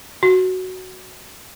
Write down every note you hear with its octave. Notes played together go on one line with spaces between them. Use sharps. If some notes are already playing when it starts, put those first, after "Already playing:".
F#4